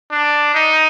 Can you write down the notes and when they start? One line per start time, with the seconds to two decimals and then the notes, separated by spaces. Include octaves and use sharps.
0.11 D4
0.54 D#4